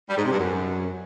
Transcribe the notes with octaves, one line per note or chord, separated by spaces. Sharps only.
G3
G#2
C3
G2
F#2